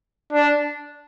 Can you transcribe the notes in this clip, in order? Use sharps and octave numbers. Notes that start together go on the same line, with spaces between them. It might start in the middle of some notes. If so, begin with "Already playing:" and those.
D4